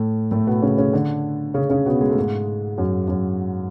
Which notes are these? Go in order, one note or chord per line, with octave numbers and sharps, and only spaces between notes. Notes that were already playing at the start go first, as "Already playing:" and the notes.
Already playing: A2 A3
A2 A3
B2 B3
C#3 C#4
C#3 C#4
D3 D4
C#3 C#4
C#3 C#4
B2 B3
G#3
A3
G#2 G#3
F#2 F#3
F#2 F#3